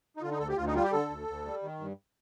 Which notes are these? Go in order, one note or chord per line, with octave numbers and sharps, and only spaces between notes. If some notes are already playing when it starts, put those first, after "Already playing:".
D#4
D3 F4
D#4
D2 A4
G4
D2 F4
D#4
G3 F4
G4
D3 A4
D2
D2
G3
D#3
G2